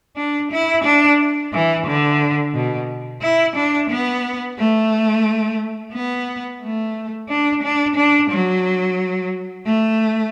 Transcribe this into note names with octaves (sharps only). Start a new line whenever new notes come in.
D4
E4
D4
E3
D3
B2
E4
D4
B3
A3
B3
A3
D4
D4
D4
F#3
A3